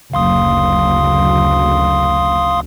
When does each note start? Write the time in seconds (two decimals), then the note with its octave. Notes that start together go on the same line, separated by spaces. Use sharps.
0.13 F#1 D2 F5 C6 D#6